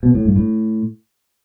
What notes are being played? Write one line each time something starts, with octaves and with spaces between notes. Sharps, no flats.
B2
A2
G2
A2